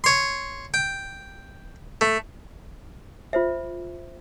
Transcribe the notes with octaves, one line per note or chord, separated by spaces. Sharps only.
C#5 C6
G5
A3
F4 C5 E5